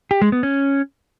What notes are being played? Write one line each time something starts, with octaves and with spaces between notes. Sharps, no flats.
G4
G#3
B3
C#4